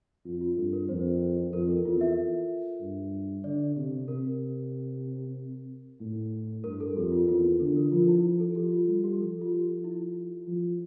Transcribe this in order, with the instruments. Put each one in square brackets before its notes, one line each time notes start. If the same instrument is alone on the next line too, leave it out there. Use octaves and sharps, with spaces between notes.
[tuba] F2 [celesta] F4
[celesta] F4
[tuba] G2 [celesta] A4
[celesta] A#4
[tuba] F2 [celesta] C5
[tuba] F2 [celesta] A#4
[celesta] A4
[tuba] E2 [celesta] F4
[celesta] E5
[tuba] G2
[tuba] D3 [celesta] D5
[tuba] C3
[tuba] C3 [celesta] A#4
[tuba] A2
[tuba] G2 [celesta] A#4
[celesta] A4
[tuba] F2 [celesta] G4
[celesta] F4
[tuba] E2 [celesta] F4
[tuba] D3 [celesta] A4
[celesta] A#4
[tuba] F3 [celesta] F4
[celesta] E4
F4
A4
[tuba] F3 [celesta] G4
[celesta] F4
[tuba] G3 [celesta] F4
[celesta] G4
[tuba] F3 [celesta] A4
[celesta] F4
G4
E4
[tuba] F3